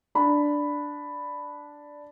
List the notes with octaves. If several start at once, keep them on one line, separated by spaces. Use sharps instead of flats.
D4 B5